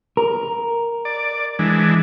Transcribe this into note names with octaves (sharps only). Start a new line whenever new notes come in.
A#4
D5
E3 G#3 D4